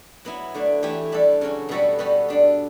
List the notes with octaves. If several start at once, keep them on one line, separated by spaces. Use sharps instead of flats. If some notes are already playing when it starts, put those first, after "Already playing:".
F#3 B3 E4
D3 A3 D4
E3 A3 E4 G4
G3 D4 A4
C#3 F#3 C#4
B2 G3 B3 F#4 A4
G3 B3 F#4 A4
G3 D4 A4